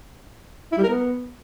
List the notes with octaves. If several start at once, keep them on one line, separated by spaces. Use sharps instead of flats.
E4
G3
A#4
B3